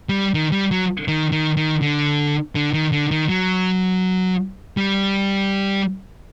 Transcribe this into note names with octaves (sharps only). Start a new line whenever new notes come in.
G3
D#3
G3
F#3
D#3
D#3
D#3
D3
D3
D#3
D3
D#3
F#3
G3